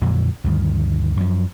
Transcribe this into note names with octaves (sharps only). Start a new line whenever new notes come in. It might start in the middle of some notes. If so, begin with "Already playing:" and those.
F2 A#2 D3 F#3
D2 G2 D#3
F#2 F3